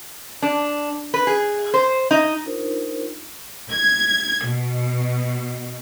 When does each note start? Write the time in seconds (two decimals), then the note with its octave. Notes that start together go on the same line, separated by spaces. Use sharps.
0.42 D4
1.14 B4
1.27 G#4
1.74 C5
2.11 D#4
2.44 D4 D#4 F4 A#4 C5
3.71 G#6
4.45 B2